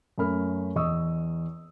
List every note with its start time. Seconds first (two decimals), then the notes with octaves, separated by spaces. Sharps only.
0.18 F#2 A3 A#4 B5 F6
0.76 E2 D#5 C#6 D#6 E6